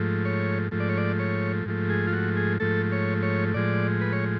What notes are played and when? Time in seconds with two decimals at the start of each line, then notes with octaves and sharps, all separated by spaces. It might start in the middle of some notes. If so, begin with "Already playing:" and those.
Already playing: G#2 F3 A3
0.25 C#5
0.71 G#2 F3 A3
0.80 D5
0.89 C#5
0.97 D5
1.19 C#5
1.66 G#2 F3 A3
1.90 G#4
2.07 F4
2.13 F#4
2.37 G#4
2.60 G#2 F3 A3 A4
2.92 C#5
3.23 C#5
3.54 A2 F3 G#3 D5
4.01 B4
4.13 C#5